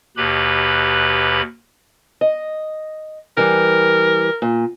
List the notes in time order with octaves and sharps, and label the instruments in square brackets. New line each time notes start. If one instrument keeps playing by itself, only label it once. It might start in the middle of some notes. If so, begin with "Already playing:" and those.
[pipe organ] D#2 B2 G4 B4 B5
[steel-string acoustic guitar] D#5
[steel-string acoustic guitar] E3 G3 [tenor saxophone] A#4
[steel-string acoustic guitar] A#2